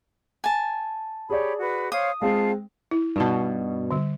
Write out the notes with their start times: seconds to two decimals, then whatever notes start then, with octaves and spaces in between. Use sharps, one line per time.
0.44 G#5 A5
1.30 G4 G#4 C#5 D5 B5
1.60 F#4 B4
1.92 C5 C#5 F5 D#6
2.22 G#3 C4 F4 G#4 F5 A5
2.91 E4
3.16 G2 B2 D#4 F#4 A5
3.91 D3 G3